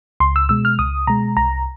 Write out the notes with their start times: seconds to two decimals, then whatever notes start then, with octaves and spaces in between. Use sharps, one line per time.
0.20 C#2 C6
0.36 E6
0.49 B2 G#3 E6
0.65 F6
0.79 C#2 D#6
1.07 B2 G#3 A#5
1.37 C2 A#5